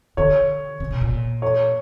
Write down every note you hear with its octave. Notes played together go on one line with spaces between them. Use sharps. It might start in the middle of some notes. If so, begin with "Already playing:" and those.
D3 C#5
C#3
B2
A#2
C#5